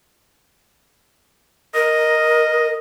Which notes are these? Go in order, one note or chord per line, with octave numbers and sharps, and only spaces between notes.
A#4 D#5